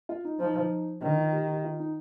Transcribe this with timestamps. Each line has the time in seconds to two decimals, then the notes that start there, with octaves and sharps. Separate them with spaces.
0.09 F4
0.25 D#4
0.40 F3 D#4
1.01 D#3 D4
1.17 F4
1.33 G4
1.48 G4
1.64 F4
1.79 D#4